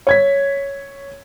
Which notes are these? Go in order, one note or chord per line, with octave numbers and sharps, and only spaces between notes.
C#5 G#6 B6